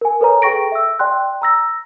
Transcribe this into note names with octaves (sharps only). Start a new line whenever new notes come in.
A#4 G#5
A4 B4 C#5 A#5
G#4 A4 G5 C#6 A#6 D7
E5 E6
D5 G5 C6 F#6
A#5 E6 A#6